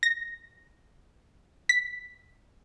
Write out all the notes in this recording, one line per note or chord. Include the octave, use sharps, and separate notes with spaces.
A#6
B6